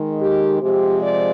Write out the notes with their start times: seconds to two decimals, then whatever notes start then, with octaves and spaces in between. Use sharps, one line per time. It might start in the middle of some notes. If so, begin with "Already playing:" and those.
Already playing: D#3 G#3
0.20 G4
0.61 C3 F3 G#3 G4
1.01 D5